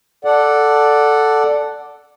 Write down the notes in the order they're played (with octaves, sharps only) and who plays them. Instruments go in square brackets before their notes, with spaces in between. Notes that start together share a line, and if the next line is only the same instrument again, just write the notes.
[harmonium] A4 D5 F#5